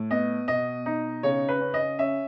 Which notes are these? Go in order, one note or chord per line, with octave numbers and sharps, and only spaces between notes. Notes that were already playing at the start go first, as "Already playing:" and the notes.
Already playing: A2
B3 D#5
B2 D#5
D#4
C#3 C#5
B4
C#4
D#5
C#4 E5